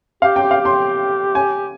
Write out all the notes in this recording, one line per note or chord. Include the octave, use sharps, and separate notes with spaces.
G4 F5
G5
G4
F5
G4
C6
G#5